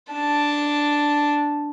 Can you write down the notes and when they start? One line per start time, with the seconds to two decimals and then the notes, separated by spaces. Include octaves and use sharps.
0.12 D4 A5